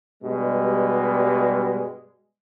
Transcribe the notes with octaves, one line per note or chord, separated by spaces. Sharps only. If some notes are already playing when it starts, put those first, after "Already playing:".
G2 B2 G3 G#3